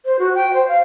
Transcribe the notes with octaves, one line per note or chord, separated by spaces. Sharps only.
C5
F#4
G5
C5
F5